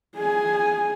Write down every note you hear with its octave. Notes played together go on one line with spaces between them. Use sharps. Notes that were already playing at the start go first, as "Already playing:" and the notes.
G#4 G#5